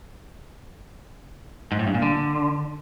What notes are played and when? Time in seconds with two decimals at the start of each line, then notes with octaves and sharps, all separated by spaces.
1.72 G#2
1.79 A2
1.87 G2
1.94 A#2
2.02 D3